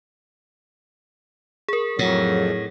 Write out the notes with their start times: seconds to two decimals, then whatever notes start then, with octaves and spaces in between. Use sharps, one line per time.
1.68 G#4 A#4
1.99 F2 A2 F#3